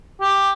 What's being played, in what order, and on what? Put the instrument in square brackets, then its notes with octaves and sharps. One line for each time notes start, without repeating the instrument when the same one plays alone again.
[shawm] G4